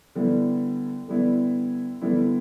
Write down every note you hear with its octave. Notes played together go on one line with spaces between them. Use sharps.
D3 G3 B3 E4
D3 G3 B3 E4
D3 G3 B3 E4